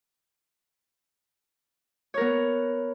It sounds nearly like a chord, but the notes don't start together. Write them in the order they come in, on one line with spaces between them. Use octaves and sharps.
C#5 A#4 B3